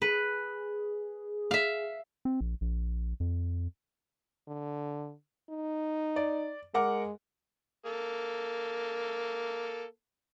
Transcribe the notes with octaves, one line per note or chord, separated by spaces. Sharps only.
G#4 B4
E5 F5
C4
A#1
A#1
F2
D3
D#4
D5
G#3 A#4 F#5 D6
A#3 A4